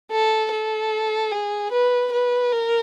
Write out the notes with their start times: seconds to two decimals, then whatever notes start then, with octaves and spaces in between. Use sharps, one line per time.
0.11 A4
0.51 A4
1.32 G#4
1.72 B4
2.12 B4
2.51 A#4